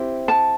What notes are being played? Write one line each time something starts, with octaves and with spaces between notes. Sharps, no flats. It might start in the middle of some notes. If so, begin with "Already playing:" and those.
Already playing: C4 E4 G4
A5